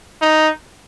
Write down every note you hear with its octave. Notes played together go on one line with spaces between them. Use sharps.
D#4